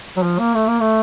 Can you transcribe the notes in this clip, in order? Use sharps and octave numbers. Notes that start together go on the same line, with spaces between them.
F#3
F3
A#3
A3
A#3
A3